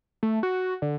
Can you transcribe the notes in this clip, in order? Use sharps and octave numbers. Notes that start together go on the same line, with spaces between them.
A3
F#4
D3